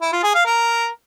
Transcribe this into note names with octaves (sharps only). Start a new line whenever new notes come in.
E4
F4
G#4
F5
A#4